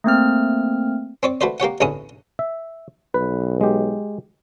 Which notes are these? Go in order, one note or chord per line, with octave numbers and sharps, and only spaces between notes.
A3 A#3 C4 F6
C4 C#5 D5
A3 F#4 B4 C5 D5
A#3 G4 C#5 F#5
A1 E2 D3 C#4 E4 D#6
E5
B1 B4
G#3 G4